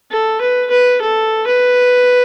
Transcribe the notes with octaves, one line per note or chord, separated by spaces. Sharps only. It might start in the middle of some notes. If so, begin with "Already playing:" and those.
A4
B4
B4
A4
B4